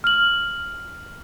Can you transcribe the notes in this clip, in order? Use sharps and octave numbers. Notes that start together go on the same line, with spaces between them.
F6 F#7